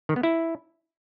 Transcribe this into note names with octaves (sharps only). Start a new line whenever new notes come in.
D#3
B3
E4